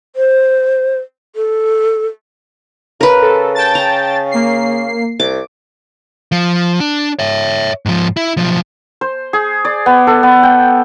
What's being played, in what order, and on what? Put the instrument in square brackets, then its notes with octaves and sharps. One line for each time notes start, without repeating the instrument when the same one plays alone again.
[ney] C5
A4
[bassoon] C#3 [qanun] A#4 B4
[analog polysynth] A4
G5 A5 A6
[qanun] A#5
[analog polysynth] A#3 C7
[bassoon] C2 [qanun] D6
[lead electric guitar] F3
D4
C#5 E5
G#2 F3
E4
B1 F3
[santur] C5
G#4
D5
B3
A4
B3
G5